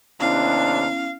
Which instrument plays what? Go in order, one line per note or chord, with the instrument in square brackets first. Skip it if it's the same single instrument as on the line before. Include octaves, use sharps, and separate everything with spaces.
[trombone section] D#2 C3 D4 [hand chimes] B3 C#4 E4 [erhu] F5